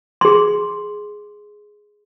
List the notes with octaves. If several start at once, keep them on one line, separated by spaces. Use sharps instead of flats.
G#4 C6